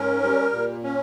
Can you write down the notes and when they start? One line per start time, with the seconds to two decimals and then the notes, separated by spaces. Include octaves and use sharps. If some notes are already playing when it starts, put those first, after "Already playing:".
Already playing: G#2 C#4 A#4
0.23 G3
0.53 A#2
0.83 C#4